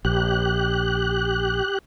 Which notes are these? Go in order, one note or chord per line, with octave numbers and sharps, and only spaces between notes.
A#1 G4 F#6